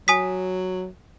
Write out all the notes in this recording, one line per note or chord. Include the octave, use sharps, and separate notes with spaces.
F#3 G#5 D#6 B6